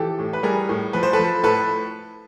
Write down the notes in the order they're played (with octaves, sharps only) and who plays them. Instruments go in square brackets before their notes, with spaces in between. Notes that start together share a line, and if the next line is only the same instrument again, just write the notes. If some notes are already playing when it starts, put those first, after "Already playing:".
Already playing: [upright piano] E3 F3 G4 A4
A2
B4
G3 G#4 A#4
A2
F3 B4
C5
A4 B4
F3
A2 A4 B4